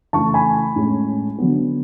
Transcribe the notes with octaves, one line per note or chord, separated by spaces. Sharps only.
C#3 E3 A3 A5 C#6
G#5 B5
A2 G#3 C#4
D3 F#3 B3